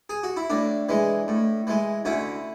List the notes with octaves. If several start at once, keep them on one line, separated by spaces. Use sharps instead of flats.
G#4
F#4
E4
A2 D4
E3 G#3
A2
E3 G#3
D2 C#4 E4